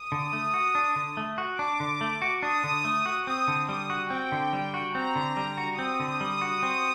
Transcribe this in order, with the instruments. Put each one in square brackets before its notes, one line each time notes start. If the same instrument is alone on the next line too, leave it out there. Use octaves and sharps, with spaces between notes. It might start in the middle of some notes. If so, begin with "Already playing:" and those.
Already playing: [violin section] D#6
[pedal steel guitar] D3
A3
F#4
D4
D3
A3
F#4
[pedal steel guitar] D4 [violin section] D6
[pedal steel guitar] D3
A3
F#4
[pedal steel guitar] D4 [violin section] D#6
[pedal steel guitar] D3
A3
F#4
[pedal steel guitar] C4 [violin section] D#6
[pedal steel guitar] D3
[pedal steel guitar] G3 [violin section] D#6
[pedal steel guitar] F#4
[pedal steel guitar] C4 [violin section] G5
[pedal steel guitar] D3
G3
F#4
[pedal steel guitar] C4 [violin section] A#5
[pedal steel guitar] D3
G3
F#4
[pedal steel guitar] C4 [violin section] D#6
[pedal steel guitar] D3
G3
F#4
C4